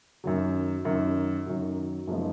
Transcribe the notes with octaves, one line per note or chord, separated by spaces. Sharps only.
F#2 D#3 F#3
F#2 D#3 F#3
F#2 D#3 F#3
F#2 F3 G#3 B3 D#4